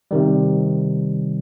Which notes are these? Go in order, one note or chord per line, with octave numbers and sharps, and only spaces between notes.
C3 D#3 G3